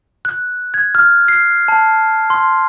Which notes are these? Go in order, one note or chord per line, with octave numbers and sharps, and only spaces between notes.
F#6
G#6
F6
C7
A5
C6